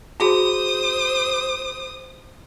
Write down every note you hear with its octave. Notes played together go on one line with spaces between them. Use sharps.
F#4 G#4 C5 B5 D#6